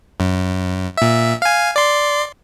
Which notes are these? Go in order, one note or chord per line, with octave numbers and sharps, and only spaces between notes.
F#2
A#2 E5
F5 G#5
D5 C6